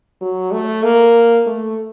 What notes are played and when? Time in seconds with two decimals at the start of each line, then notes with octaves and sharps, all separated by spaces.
0.21 F#3
0.52 A3
0.83 A#3
1.46 A3